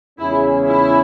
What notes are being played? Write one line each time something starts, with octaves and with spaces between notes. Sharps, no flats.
E2 C#3 G#3 C#4 E4 G#4
E4